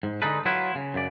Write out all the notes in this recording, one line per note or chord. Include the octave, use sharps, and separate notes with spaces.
G#2
D3 G#3 D4 D#4 A4 B4
F#3 E4 F4 B4
C#3
F#2 C#3 D5